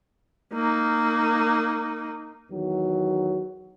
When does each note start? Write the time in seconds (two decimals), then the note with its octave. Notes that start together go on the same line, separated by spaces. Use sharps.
0.53 A#3 D#4
2.50 E2 D#3 F#3